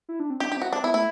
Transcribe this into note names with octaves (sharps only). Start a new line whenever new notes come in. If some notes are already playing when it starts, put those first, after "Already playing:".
E4
D4
C4
D4 G4
D4 G4
C4 F#4
C4 D4
B3 E4
A3 E4